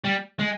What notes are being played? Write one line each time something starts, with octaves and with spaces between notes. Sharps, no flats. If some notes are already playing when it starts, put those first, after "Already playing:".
G3
G#3